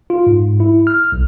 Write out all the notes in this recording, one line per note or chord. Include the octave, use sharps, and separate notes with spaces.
F4
G#2
E4
F6
B1